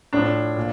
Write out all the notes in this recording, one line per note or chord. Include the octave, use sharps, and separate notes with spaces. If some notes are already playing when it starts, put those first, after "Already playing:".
A2 F3 D4
A#2